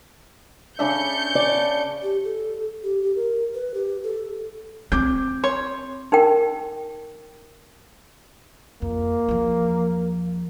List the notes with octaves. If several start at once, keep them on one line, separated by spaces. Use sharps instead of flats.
C#3 D4 E5 G6 C#7
D5
G4
A4
G4
G4
A#4
B4
G4
A4
C4 D6 G6
C#5 C6
D#4 A#4 G5
F2 A#3
E2 F3